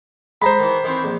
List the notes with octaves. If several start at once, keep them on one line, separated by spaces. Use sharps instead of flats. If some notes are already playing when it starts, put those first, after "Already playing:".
G#3 C5 A#5 B5
D#3 E3
D#3 E3 C4
A#1